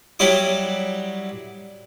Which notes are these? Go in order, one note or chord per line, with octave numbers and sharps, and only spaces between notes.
F#3 G3 E4 D6 D#6